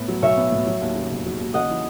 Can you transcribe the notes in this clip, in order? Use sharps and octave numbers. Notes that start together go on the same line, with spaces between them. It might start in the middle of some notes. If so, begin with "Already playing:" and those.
Already playing: A2 B3
F#3
B1 C#5 E5
B3
A2
F#3
D#2
C#3
E1
F#3
D#2
C#3 D#5 F#5
E3